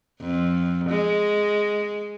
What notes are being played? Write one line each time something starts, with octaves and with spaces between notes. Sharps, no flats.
F2
G#3